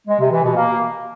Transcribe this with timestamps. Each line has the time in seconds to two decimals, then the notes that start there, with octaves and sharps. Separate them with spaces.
0.07 G#3
0.19 C3
0.31 E3
0.43 B2
0.55 A#3